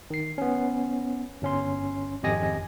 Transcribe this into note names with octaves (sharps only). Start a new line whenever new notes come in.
D#3 C7
B3 C#4
G1 C#4 C6
G#1 F2 G4 D#5 G#5 A#6